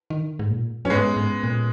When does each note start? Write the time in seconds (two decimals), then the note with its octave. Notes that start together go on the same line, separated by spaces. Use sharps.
0.10 D#3
0.39 G#2
0.50 A#2
0.85 F#2 C#4
0.90 G#2 G#3 B3
1.16 G#2
1.43 A#2